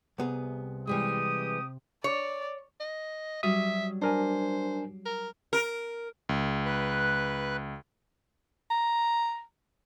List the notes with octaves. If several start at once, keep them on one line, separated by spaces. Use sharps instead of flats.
C2 C3 B3 G#4
E3 G3 G#3 G4 D#6
C#5 D5
D#5
F#3 G3 C#4 E5 D#6
D4 A#4 C5 G#5
A#4
A#4
C#2
B4 F#6
A#5